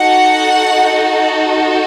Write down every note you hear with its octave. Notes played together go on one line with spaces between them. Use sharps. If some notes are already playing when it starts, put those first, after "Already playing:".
Already playing: D#4 F#4 A4 F#5